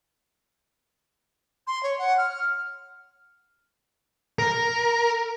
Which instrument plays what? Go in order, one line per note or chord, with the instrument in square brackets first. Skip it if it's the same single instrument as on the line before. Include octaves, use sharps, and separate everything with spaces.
[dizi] C6
C#5
F#5
F6
[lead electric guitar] A#4